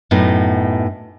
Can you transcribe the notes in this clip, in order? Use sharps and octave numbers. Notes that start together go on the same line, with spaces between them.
F#2 A2 B3 D#4